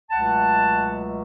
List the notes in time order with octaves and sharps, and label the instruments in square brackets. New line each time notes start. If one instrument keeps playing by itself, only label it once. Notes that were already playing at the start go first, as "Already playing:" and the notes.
[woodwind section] C#2 B2 F#3 A3 F#5 A5